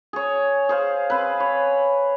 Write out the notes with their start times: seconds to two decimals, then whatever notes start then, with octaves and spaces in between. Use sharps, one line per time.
0.13 G#4 C#5
0.69 G#4 C5 F5
1.10 C4 B4
1.40 C#5